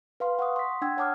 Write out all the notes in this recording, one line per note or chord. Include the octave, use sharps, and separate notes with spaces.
B4 F5 C6
F#5 C#6 D#6
C6 B6
D4 F#5 G5 E6 G#6
C#5 F#5 A5 D6 D#6 F6